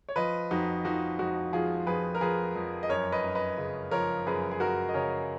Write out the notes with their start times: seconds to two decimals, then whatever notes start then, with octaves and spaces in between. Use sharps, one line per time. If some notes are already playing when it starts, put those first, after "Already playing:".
0.09 C#5
0.16 F3 B4 D#5
0.51 F2 D#4 F#4
0.85 F3 D#4 F#4
1.19 F2 D#4 F#4
1.53 F3 F4 G#4
1.87 F2 G#4 B4
2.15 A#4
2.21 F3 G#4 B4
2.56 F2
2.83 D#5
2.89 F#2 A#4 C#5
3.12 B4 D#5
3.24 F#2
3.35 B4 D#5
3.58 C#3
3.91 F3 A#4 C#5
4.26 F#2 G#4 B4
4.51 G#4
4.60 F#2 F#4 A#4
4.89 D#5
4.94 C#3 A#4 C#5